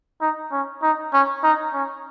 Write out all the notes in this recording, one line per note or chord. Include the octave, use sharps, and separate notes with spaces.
D#4
C#4
D#4
C#4
D#4
C#4